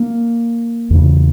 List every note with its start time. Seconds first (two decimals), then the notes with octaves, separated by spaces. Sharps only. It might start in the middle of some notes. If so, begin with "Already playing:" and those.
Already playing: A#3
0.90 E2 C#3